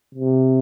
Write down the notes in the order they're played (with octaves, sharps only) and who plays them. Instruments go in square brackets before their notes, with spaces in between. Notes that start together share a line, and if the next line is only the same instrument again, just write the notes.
[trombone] C3